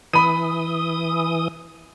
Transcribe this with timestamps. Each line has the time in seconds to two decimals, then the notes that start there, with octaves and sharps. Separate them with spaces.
0.14 E3 B5 D#6 D#7